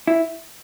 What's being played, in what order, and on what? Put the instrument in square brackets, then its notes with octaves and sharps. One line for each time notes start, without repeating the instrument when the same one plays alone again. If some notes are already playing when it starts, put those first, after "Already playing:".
[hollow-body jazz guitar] E4